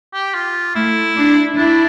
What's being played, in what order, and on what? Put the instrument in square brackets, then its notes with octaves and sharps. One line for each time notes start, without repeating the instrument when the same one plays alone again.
[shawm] G4
F4
[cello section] A3 [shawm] E4
[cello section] D4
[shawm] D4 [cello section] E4